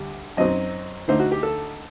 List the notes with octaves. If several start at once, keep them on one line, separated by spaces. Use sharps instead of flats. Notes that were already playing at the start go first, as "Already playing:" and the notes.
Already playing: D2 D3 G3
F#2 F#3 C4 D#4 D#5
D2 D3 A3 D#4 C5
F#4
G4
A4